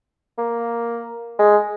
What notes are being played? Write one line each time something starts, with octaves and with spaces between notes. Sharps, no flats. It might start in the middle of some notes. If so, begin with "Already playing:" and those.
A#3
G#3